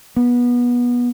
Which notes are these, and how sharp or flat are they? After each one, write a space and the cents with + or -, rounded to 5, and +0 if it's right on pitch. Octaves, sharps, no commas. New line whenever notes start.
B3 -20